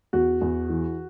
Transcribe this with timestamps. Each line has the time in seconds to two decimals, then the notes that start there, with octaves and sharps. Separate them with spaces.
0.13 E2 F#4
0.41 E2
0.69 E3